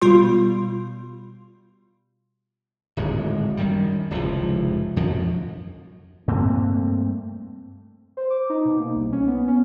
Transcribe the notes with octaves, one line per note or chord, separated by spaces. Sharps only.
B2 G3 F4 C6
D1 G#1 F#2 G#3
F#2 D#3 G3
F1 C#2 A2 F3
F2 F3 F#3
G2 A3 A#3 C4
C5
D6
D#4
B2
A#3
C2
C#4
B3
C#4